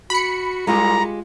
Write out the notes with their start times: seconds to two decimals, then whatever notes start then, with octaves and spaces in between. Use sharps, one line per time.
0.10 F#4 B5 C#7
0.67 C2 G#3 F4 G4 A#5